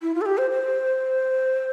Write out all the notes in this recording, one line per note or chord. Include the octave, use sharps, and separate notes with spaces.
E4
F4
A4
G4
C5
C5